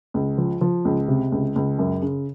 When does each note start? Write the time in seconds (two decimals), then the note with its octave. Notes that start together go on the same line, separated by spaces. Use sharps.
0.14 C#2
0.38 F3
0.61 F3
0.85 C#2
1.08 C3
1.32 C#2
1.56 C#2
1.79 F#2
2.02 C#3